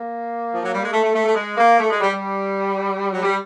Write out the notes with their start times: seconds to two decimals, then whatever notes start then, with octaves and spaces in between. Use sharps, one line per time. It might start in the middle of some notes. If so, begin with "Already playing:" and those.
Already playing: A#3
0.52 F3
0.61 F#3
0.72 G3
0.81 G#3
0.91 A3
1.02 A3
1.13 A3
1.24 A3
1.35 G#3
1.57 A#3
1.79 A3
1.90 G#3
2.01 G3
2.13 G3
3.11 F#3
3.22 G3